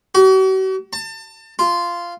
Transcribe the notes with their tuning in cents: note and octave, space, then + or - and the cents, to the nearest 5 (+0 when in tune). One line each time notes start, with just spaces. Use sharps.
F#4 +45
A5 +30
F4 -10